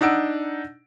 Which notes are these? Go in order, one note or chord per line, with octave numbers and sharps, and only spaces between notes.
D4 D#4 F#5 E6 D7